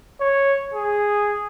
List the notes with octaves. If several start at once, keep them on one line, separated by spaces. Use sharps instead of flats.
C#5
G#4